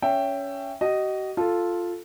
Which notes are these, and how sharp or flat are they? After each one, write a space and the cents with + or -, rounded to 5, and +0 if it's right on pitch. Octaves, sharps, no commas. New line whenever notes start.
C#4 +15 E5 +15 G5 +0
F#4 +45 D#5 -5
F4 +0 A4 +0